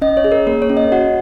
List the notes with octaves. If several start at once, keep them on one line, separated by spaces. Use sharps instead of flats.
C#4 D#5
C#5
G#4
A#4
A#3 A#4
C#5
C#4
D#5
F#4 F#5